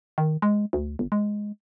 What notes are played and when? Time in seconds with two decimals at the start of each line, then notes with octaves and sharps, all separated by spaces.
0.18 D#3
0.42 G#3
0.73 D2
0.99 G1
1.12 G#3